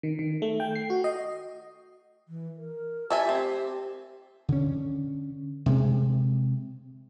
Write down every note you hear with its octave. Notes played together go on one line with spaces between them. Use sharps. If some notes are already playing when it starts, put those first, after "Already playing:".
D#3
D#3
A3
G5
C7
F#4
D#5
E3
A#4
G4 A4 E5 G#5
C4
D3 C#4
C3 G#3